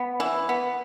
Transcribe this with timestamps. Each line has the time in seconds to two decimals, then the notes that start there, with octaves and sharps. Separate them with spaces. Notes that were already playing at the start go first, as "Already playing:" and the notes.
Already playing: B3
0.20 E3
0.49 B3